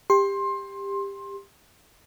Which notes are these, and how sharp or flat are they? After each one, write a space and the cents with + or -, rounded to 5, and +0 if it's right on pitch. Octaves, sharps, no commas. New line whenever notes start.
G4 +20 C6 +20